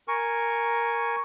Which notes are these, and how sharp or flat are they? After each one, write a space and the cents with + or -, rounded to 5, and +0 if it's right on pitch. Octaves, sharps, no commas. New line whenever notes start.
A#4 +0 G#5 +0 C#6 +0